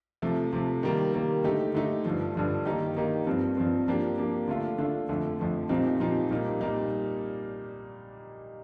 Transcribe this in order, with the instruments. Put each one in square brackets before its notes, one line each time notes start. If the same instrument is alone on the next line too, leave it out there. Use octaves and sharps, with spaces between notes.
[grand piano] C3 F3 A3
C3 F3 A3
D#3 G3 A#3
D#3 G3 A#3
D3 A3 D#4 G4
D3 A3 D#4 G4
G2 D3 F3
G2 D3 F3
D#3 A#3 D#4 G4
D#3 A#3 D#4 G4
G2 F3 C4
G2 F3 C4
F3 A#3 D4 G4
F3 A#3 D4 G4
D3 A3 D4 F4
D3 A3 D4 F4
F2 D3 F3 A3
F2 D3 F3 A3
A#2 F3 C4 D#4 G4
A#2 F3 C4 D#4 G4
A#2 G3 A#3 D#4
A#2 G3 A#3 D#4